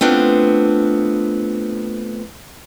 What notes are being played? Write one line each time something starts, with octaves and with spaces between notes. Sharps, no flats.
A3 B3 C4 D4 F4